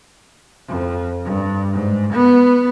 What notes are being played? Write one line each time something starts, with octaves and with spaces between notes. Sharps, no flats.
F2
G2
G#2
B3